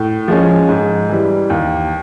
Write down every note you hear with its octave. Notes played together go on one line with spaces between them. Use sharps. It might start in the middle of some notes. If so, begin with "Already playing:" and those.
Already playing: A2
F3 G#3 C#4
G#2
E3 G3
D#2